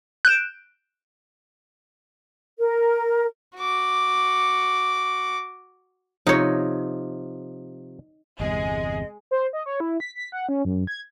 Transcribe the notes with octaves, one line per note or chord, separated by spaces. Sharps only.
F#6 G6 D7 E7
A#4
F#4 D6
C3 F3 D#4 C#5
G1 E2 C3 G#3 G#4 D#5
C5
D#5
C#5
E4
B6
B6
F#5
C#4
F#2
G#6